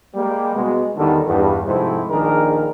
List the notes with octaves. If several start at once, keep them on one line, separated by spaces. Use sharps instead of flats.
G3 G#3 A#3
B2 G#3
E2 D3 D#3 G3 A4
E2 G2
G#2 C3 F3 A3 C4 E4
A#1 D#3 D4 G#4 A#4